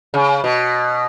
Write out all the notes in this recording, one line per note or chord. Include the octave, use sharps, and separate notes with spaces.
C#3
B2